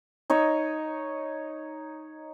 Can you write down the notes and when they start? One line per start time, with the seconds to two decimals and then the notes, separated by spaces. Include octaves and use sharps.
0.30 D#4 C#5 D#5 E6